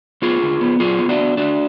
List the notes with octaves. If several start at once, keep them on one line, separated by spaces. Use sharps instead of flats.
B3 F4 G#4
D3
B3
F#3 F4 G#4
B3
D4 F#4
B3
D3 D4 F#4